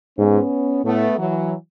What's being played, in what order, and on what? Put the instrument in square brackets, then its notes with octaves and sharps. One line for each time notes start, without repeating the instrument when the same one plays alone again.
[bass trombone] G#2 [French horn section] B3 C#4
[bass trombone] A2 [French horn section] A3 B3
[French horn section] E3 F#3